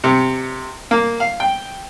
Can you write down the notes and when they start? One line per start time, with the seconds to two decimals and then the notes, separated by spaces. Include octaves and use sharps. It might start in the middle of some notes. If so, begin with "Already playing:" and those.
0.04 C3
0.91 A#3
1.20 F5
1.40 G5